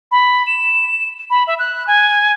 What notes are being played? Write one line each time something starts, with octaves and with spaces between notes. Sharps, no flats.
B5
E7
B5
E5
F#6
G#5